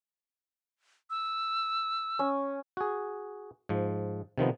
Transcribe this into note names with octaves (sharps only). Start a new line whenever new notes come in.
E6
C#4
F#4 G#4
G#2 F3
C3 D#3 F3 B3